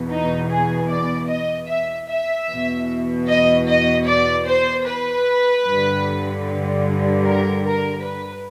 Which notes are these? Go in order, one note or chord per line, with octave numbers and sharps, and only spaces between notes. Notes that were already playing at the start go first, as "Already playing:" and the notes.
Already playing: E2 B2
D#4
G#4
D5
D#5
E5
E5
E2 B2
D#5
D#5
D5
C5
B4
G2 D3
A#4
A#4
B4